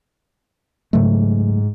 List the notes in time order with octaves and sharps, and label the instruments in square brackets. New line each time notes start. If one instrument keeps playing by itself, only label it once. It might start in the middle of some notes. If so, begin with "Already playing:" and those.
[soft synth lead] G#2 [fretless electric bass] C#3 F#3 A3